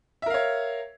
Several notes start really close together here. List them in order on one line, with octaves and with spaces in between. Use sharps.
E5 A#4 F5 C#5